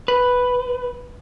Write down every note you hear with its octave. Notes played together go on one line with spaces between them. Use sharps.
B4